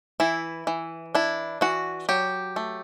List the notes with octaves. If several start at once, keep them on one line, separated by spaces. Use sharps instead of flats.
E3 E4
E3
D4 E4
E3 F#4
F#3 G4
A3